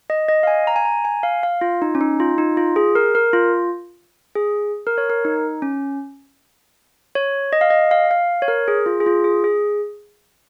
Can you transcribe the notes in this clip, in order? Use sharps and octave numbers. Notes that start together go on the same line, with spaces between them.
D#5
D#5
F5
G#5
A#5
G#5
A#5
G#5
F5
F5
F4
D#4
C#4
D#4
F4
D#4
F4
G#4
A#4
A#4
F4
G#4
A#4
C#5
A#4
D#4
C#4
C#5
D#5
F5
D#5
F5
F5
C#5
A#4
G#4
F4
G#4
F4
G#4
G#4